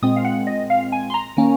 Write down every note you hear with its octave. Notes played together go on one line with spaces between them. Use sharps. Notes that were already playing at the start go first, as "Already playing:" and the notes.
A#2 G#3 C4 D#6
F5
F#5
D#5
F5
G#5
C6
A#5
D#3 A#3 C#4